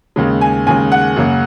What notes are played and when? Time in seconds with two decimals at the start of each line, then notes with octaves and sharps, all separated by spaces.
0.16 D#2 C#3 G#3
0.41 G#5
0.67 D#2 C#3 G#3 G#5
0.92 F#5
1.16 F#2 C#3 A#3